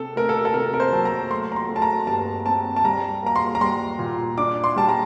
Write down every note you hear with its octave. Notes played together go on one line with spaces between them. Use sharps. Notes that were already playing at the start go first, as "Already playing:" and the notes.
Already playing: C3 A4
A3 A#4
A4
A4
C3 A#4
A#4
C5
F#3 A5
A#5
A3 C6
A#5
C6
A3
A5
A#5
G2 A5
C4 A5
A5
G3 A#5
A#3 A#5
C6
A#5
G3 C6
A#2
D4 D6
C6
G3 A5
A#5